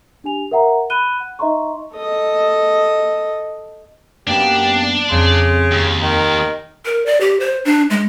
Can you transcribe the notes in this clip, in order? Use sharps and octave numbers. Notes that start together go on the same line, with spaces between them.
D4 G4 G#5 F7
A#4 E5 F#5 A#5
B5 F#6 D#7 G7
F#5
D#4 D#5 E5 A#5 C6 C#6
A4 D#5
F#2 A#3 B3 D4 G4
F2 C#3 C6
D#2
D#3
A#4
D5
G4
C5
D4
G#3